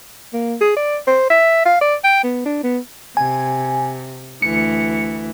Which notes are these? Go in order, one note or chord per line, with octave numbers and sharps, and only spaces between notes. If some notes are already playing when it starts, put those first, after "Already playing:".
A#3
G#4
D5
C5
E5
F5
D5
G5
B3
D4
B3
C3 G#5
D2 E3 C#7